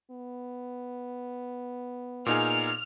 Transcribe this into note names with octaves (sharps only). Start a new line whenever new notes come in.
B3
A#2 D#4 G#4 F6